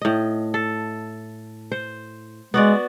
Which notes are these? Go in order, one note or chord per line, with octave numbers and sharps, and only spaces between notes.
A2 D#5
A4
C5
G#3 B3 F#4 D5